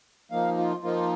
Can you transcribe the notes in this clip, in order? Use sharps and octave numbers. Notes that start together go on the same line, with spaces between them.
F3 A#3 D#4 F5
F4
F3 A#3 D#4 F4